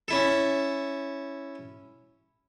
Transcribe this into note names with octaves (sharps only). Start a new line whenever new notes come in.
C#4 E4 A4